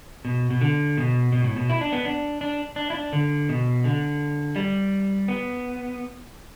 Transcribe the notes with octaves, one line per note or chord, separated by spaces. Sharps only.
B2
B2
D3
B2
B2
A2
B2
E4
D4
B3
D4
D4
D4
E4
D4
D3
B2
D3
G3
B3